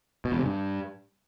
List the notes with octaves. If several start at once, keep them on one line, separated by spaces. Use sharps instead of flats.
B2
E2
C3
G2